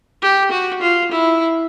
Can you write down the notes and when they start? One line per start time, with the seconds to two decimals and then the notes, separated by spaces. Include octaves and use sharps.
0.22 G4
0.51 F#4
0.82 F4
1.12 E4